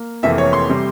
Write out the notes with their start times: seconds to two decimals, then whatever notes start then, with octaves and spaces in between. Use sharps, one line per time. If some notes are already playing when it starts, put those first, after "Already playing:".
Already playing: A#3
0.23 F1 F2 E3 A#3 E5
0.38 C#5
0.53 C6
0.69 C3 G3